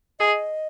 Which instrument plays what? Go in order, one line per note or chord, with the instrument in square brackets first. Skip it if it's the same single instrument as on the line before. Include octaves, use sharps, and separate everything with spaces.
[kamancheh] G#4 [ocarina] D#5